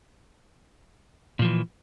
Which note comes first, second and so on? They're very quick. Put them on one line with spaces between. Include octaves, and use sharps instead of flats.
A#2 F3 E3